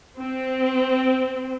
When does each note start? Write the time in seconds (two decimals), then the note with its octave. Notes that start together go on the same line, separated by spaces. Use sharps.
0.19 C4